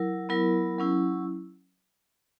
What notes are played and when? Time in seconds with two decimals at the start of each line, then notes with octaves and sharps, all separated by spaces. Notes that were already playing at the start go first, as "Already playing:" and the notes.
Already playing: F#3 E4 A#4
0.29 F#3 B3 E4 A#4
0.79 F#3 C#4 E4